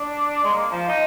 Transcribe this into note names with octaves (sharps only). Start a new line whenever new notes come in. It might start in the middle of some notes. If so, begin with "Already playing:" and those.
Already playing: D4
G#3
A#3
F3
D#4